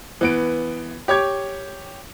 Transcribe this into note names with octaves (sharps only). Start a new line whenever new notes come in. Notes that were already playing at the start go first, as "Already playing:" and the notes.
E3 B3 D7
G4 C#5 D6 G#6